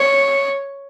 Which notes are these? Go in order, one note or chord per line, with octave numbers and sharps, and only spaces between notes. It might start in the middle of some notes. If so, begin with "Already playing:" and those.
Already playing: C#5